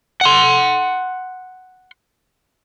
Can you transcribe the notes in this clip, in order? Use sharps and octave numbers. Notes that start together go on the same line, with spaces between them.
F#5 C6